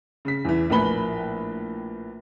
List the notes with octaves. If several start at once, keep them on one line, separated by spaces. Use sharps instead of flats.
C#3 B6
E2 E3
A#1 A2 A#3 B4 B5 G7